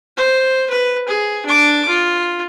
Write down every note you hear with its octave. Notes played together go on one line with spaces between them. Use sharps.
C5
B4
G#4
D4 D6
F4